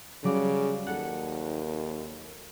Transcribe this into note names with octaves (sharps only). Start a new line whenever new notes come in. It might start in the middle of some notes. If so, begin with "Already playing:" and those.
C#3 F#3 G3 D5
D#2 A4 F#5